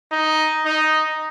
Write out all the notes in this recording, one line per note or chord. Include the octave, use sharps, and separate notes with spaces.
D#4
D#4